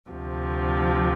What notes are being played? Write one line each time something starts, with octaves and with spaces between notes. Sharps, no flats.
D2 C3 F3